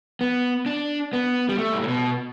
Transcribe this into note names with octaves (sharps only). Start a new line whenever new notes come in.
B3
D4
B3
G3
A3
G2
A2
B2